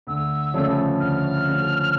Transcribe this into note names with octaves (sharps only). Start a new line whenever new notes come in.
D2 E6
C#3 F3 A3 C#4
D2 F6
C#3 F3 A3 C#4